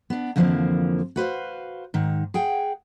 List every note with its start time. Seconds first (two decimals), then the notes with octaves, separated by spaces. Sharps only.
0.10 B3 D4
0.36 F2 D3 E3 F3 G#3 A#3
1.16 F#4 B4 C5 F5
1.94 G#2 D#3
2.34 G#4 F#5 G5